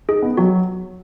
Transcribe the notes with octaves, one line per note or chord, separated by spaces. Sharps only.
D#4 G#4
B3
F#3 F#4